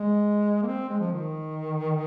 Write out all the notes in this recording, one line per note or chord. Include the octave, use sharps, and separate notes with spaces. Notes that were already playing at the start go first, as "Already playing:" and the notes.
Already playing: G#3
A#3
C4
G#3
F3
D#3